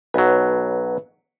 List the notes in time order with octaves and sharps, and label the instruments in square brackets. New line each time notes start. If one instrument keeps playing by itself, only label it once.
[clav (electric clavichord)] B1 F#3 [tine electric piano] B4